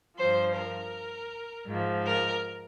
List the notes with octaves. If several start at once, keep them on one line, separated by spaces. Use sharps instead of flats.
G2 F3 C5
A#4
G#2 F3
A#4